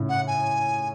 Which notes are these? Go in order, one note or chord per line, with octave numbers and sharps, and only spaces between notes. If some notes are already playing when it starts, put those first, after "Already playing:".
Already playing: A2 C#3
F#5
G#5